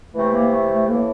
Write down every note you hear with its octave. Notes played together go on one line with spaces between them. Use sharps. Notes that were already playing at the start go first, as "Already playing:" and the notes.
C3 E3 A3
A#3
A3
A3
A2 E3 A#3